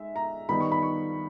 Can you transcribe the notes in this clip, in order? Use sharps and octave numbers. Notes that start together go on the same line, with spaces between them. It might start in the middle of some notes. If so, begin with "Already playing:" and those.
Already playing: G#3 D#4 E5
A#5
D#3 G3 B3 D#4 B5
C#6
B5
C#6